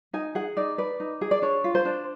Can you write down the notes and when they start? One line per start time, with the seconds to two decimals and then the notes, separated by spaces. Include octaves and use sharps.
0.14 D#4 G#5
0.35 G#4 F#5
0.57 D#4 D5
0.78 B4 D5
1.00 D#4
1.21 G#4
1.31 D5
1.42 D4 C#5
1.64 F4
1.75 C5
1.85 D4